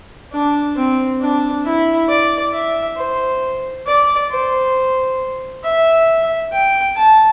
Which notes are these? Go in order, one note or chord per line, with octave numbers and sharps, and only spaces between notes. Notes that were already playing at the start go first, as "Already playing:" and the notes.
D4
C4
D4
E4
D5
E5
C5
D5
C5
E5
G5
A5